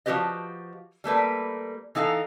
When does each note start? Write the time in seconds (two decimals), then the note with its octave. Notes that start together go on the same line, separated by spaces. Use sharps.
0.06 F3 C#4 F#4 G4 B4 D#5
1.04 G3 A3 A#3 B4
1.95 E3 D#4 A4 F5 A#5